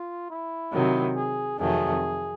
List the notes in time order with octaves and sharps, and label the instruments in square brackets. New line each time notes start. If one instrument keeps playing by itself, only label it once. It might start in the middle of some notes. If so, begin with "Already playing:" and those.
Already playing: [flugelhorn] F4
E4
[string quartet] C3 D#3 F#3
[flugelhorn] G#4
[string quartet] F2 C3 D#3 F#3 A3 [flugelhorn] G#4